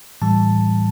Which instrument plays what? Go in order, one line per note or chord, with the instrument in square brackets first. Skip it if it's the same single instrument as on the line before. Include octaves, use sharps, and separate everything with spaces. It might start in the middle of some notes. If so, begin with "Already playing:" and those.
[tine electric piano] A2 E3 G3 A5